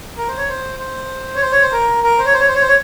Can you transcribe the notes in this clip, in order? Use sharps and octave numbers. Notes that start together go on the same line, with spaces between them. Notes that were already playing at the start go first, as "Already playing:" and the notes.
A#4
C5
C#5
C5
C5
C#5
C5
C#5
C5
A#4
A#4
C5
C#5
C5
C#5
C5
C#5
C5
C#5